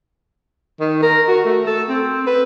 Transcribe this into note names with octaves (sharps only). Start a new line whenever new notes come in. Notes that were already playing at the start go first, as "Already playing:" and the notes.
D#3
A#4
F#4
A3
A4
C4
B4